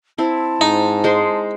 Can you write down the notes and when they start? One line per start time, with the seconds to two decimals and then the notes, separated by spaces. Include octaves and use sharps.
0.18 C4 E4 A5
0.61 G#2 D#4
1.04 G#3 C5